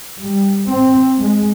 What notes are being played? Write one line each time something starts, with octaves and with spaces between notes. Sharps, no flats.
G3
C4
G#3